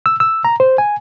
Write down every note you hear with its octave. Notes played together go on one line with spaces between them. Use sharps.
E6
E6
A#5
C5
G#5